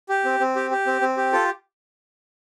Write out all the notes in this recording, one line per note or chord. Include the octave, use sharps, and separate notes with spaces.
G4
C4
C4
G4
G4
C4
C4
G4
F4 A4